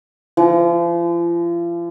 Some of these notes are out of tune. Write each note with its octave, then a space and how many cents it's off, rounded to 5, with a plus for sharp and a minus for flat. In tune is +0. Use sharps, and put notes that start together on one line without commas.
F3 -40